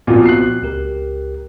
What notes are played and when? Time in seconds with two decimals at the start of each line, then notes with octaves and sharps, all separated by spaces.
0.07 A#2 F3 B3 C4 F#4
0.26 F#6 C7
0.63 C#2 G4 A#4